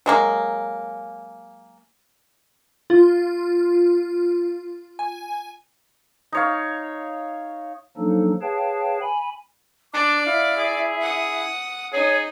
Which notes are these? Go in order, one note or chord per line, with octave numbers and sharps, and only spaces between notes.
F#3 G#3 A#3
F4
G#5
D#4 C#5 F5
F3 F#3 A#3 D4 D#4 A4
G#4 B4 C#5 F5 G5 A5
G#5 B5
D4 D5 D6
E4 F5
G#4
F#5 D#6
D#4 G#4 C#5